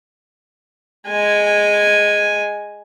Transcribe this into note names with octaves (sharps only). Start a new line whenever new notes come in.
G#3 G#5